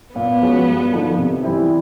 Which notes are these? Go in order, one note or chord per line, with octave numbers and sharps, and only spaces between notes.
A#2 B3
F3 G#3 C#4 F#4
G2
D3 F3 A#3 D#4
C3
E3 G3 C4 E4